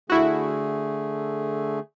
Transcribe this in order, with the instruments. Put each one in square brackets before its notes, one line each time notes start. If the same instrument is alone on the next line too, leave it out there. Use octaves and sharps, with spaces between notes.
[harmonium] D3 A3 G#4 [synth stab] E4 F#4